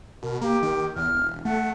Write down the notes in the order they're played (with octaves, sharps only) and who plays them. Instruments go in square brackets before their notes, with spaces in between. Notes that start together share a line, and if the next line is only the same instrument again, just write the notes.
[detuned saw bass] B2 [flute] A#4
[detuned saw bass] A#3 [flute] G4
[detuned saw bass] D#3
[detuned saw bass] E2 [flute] F6
[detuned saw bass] E1
[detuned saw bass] A3 [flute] F#5